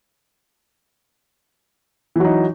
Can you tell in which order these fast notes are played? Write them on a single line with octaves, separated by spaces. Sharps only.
E3 F#3 D#4